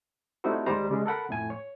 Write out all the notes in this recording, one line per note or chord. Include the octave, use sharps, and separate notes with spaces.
G3 A3 C4 D#4 E4 F#4
D#2 D#3 G3 G#3 C5 A#5
C#3 G3 G#3 C#4
A4 A#4 F#5 B5
F2 A2 G#5
C#5